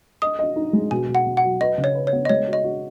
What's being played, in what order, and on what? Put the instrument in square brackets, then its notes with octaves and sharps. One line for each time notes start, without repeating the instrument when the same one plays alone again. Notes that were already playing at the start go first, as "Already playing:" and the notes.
[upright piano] D#5 [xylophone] D#6
[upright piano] D#5
D#4
G#3
[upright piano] B2 [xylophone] G#5
[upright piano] B2
[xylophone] F#5
[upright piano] B2
[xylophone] F#5
[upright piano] F#3
[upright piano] B4 [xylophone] D#5
[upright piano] C#3
[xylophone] C#5
[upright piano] B4
[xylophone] C#5
[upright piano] B3
[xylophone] D#5
[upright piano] G#3 [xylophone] C#5
[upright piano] F#4
[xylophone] D#5
[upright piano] F#4